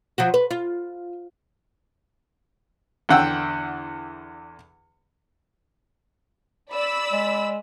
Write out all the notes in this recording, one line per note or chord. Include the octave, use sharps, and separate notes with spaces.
F3 F#3 F#4
B4
F4
E2 D3 F#5 G5 E6
D5 B5 E6
G#3